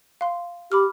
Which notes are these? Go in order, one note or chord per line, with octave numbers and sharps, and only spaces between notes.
F5 C6
G4 B5 D6 F6